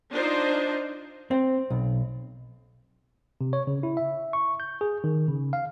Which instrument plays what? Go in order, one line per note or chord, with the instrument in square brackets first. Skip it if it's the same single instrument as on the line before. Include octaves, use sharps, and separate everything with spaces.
[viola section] D4 D#4 F4 C5
[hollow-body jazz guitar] C4
B1
[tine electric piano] C3
C#5
C#3
E4
E5
C#6
G6
G#4
D#3
C#3
F5